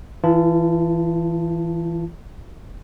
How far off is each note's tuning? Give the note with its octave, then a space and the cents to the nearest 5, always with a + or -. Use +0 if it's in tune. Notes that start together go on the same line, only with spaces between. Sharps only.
E3 +0 F4 -40 A5 +0